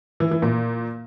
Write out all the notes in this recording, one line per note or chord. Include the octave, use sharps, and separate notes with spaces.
E3
E3
A#2